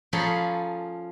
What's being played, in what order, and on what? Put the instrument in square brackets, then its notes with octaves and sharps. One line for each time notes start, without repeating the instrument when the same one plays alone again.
[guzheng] F3 C#4 G#4 A4 A#5 B5